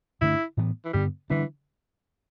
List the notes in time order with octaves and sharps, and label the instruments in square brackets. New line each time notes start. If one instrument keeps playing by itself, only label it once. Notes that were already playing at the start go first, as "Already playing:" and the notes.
[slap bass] G2 D3 A3 D4 [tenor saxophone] E4
[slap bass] A2 E3 B3
[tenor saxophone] E3
[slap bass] G2 D3 B3 [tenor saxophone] G3
[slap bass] D3 G3 D4 [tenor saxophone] E3